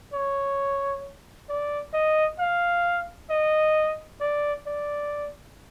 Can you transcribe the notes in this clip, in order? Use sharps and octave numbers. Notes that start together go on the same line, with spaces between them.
C#5
D5
D#5
F5
D#5
D5
D5